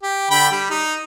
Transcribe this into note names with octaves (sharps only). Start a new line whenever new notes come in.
G4
D3 G5 B5
G3
D#4